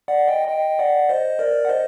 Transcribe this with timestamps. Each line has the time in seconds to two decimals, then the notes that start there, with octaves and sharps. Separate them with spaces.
0.08 D5 F#5
0.28 D#5 G5
0.48 D#5 G5
0.79 D5 F#5
1.09 C5 D#5
1.39 A#4 D5
1.65 F#5
1.69 C5 D#5